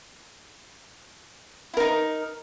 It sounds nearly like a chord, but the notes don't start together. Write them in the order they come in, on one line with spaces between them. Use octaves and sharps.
E4 A#4 D#4